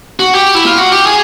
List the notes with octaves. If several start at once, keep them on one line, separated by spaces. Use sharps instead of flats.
F#4
G4
E4
F4
F#4
G4
G#4